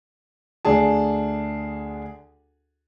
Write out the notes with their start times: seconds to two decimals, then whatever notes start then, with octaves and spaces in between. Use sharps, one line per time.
0.65 D2 D4 G#4 A5